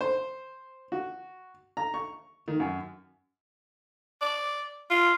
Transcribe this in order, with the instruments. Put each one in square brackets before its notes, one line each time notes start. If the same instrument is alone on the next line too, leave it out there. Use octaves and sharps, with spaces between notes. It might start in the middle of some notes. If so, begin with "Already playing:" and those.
[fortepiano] C5
F#4
A#5
C#6
D#3
F#2
[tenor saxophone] D5
F4